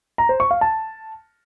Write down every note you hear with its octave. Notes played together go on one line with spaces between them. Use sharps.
A#5
C5
C#6
F5
A5